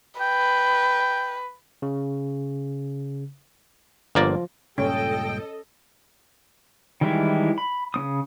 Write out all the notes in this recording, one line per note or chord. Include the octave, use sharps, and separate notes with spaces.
B4 G5
C#3
G1 F3 A#3 F4 D5
C#2 G2 A#2 C#4 A4 D#5 G5
D#3 E3 G3 G#3 E4
B5
C#3 C4 D#6